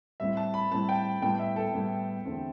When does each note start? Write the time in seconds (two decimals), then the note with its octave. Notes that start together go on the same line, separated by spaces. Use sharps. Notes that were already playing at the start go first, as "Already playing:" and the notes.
0.20 A2 G3 C4 E4 E5
0.37 A5
0.54 B5
0.71 A2 G3 C4 E4 A5
0.89 G5
1.22 A2 G3 B3 E4 G5
1.40 E5
1.56 A4
1.73 A2 G3 B3 E4
2.25 E2 D3 A3 C4 E4